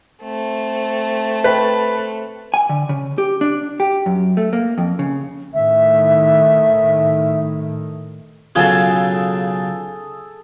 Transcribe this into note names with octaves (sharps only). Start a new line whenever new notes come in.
A3 C4
B4 G5
G#5
D3
C#3
G4
D4
G4
F#2
A3
A#3
F2
C#3
A2 D#3 E5
B1 C#3 F4 G#4 A4